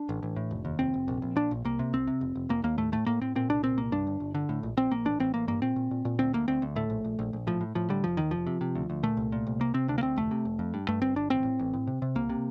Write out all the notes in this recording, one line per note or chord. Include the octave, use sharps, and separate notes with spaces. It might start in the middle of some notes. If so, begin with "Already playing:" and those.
Already playing: D4
A1
A1
A2
F1
D#2
F1 C4
F1
A#1
A#1
A#2 D4
A#1
C2 A#3
C3
C2 C4
C3
F1
F1
F1 A#3
D#2 A#3
A2 A3
A2 A3
A2 A#3
A2 C4
A#2 C4
C2 D4
A#2 C4
C2 A#3
G2 D4
G1
G1
D3
A2
A#1
A#1 C4
A#1 A#3
A1 D4
A1 C4
A1 A#3
G2 A#3
A#2 C4
A#2
A#2
A#2
D2 C4
D2 A#3
D2 C4
D2
A2 A3
A#1
A#1
A#1
A#1
A2 F3
A2
A2 F3
D3 G3
F1 F3
D#2 D#3
F1 F3
C3
C3
D2
D2
A#2 A3
C2
A#2
C2
C3 A#3
C3 C4
D2 D4
A#3
D2 C4
F1 A3
C3
F1
F2
G2
G2 A3
G1 C4
G1 D4
A1 C4
A2
A1
A2
C3
C3
C2 A#3
C3